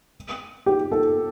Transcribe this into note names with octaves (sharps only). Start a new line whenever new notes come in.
G4
A4